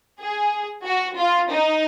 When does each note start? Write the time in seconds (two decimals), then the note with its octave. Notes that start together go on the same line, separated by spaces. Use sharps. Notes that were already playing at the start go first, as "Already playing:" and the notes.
0.20 G#4
0.84 F#4
1.17 F4
1.48 D#4